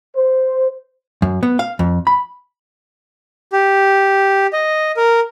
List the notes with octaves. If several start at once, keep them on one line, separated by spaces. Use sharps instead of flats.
C5
F#2
B3
F5
F2
B5
G4
D#5
A#4